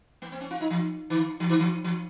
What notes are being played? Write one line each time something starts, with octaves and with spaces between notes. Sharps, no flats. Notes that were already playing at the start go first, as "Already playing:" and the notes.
A#3
C4
C#4
F4
D#4
F3
D#3
F3
D#3
F3
F3